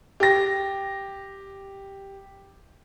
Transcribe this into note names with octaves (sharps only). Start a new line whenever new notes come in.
G4 A#6